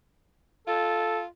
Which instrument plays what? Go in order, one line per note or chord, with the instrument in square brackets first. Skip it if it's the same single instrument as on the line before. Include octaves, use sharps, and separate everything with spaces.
[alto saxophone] F4 [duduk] A4